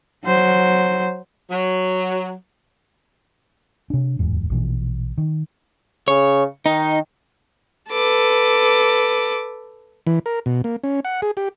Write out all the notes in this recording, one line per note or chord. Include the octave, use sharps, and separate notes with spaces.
F#3 C5
F#3
C3 D4
D1 E2 G#2
A#1 B2 E3
D#3
C#3 C#5
D#3 D#4
A4 B4 D6
E3
A#4
B2
A#3
C#4
F#5
G#4
G4